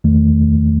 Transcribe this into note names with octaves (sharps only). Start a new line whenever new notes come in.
E2 D#3 A3